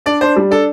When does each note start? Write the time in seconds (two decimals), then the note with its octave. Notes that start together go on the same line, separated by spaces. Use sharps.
0.06 D4 D5
0.21 D4 C5
0.36 G3
0.51 D4 A4